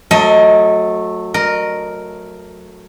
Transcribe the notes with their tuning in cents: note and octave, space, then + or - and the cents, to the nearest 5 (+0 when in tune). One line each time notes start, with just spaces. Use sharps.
F#3 -20 A3 +0 D#5 +25
A#4 +0 D#5 -30